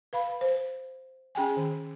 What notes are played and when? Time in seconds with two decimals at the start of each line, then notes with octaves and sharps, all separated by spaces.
0.13 B4 F5 B5
0.41 C5
1.35 C#4 G#4 G5 G#5
1.57 D#3